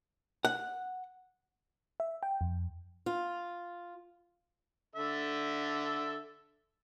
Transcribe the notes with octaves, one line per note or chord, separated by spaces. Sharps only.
F#5
E5
G5
F2
F4
D3 A4 E5